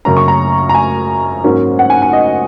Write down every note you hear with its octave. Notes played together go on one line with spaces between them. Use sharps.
F#2 C#3 A#3 C#4 A#5
C#6
A#5
A#5
G#5
G#2 F#3 A#3 C#4
F#5
G#5
G#5
D#5